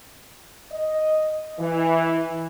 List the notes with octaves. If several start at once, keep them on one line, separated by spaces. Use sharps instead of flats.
D#5
E3